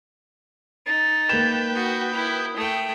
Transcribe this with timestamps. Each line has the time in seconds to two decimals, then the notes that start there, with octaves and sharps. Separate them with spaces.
0.86 D#4 A6
1.29 A#3 B4 G5 E7
1.75 F#4 D#6
2.14 E4
2.57 A3 G5